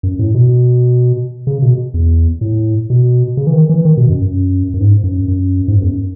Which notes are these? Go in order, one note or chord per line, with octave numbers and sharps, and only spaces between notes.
F#2
A2
B2
C#3
B2
E2
A2
B2
C#3
E3
D#3
E3
D#3
B2
F#2
F#2
F#2
G#2
F#2
F#2
G#2
F#2
E2
F#2